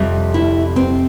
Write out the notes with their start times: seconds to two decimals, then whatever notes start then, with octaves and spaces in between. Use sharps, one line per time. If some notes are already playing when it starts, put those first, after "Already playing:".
Already playing: F2 C3 G3
0.34 E4
0.76 C4